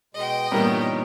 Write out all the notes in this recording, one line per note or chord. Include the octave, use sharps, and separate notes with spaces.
B2 G#3 D#5 G5
G2 A#2 E3 B3 D#4 A#4 C#5